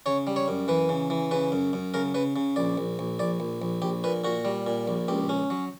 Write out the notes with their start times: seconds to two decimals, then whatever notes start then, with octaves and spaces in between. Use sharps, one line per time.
0.06 C#3 C#5
0.27 G3
0.36 C#5
0.48 F#2
0.68 E3 B4
0.89 C#3
1.10 E3
1.31 C#3 B4
1.52 F#2
1.73 F#2
1.94 C#3 A#4
2.14 C#3 B4
2.36 C#3
2.56 A#1 D5
2.78 A#1
2.99 A#1
3.19 A#1 D5
3.40 A#1
3.62 A#1
3.82 A#1 G4
4.04 A#2 B4
4.24 A#2 F#4
4.45 G3
4.67 A#2
4.87 A#1
5.08 C#2 G4
5.29 C#4
5.50 F#3